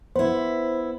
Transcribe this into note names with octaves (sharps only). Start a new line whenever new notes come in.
B3 E4 C5